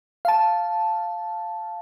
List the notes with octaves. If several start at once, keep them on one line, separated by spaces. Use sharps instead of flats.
F5 A5